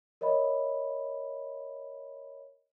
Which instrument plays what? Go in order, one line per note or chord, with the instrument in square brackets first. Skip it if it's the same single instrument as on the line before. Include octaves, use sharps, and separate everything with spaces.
[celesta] A#4 C#5 D#5 E5 B5